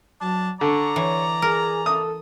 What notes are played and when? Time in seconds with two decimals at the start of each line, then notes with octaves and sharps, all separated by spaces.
0.21 F#3 D4 A5
0.61 D3 D5 A#5 C#6
0.96 E3 C#5
1.42 G#4 A#4
1.86 A4 D#6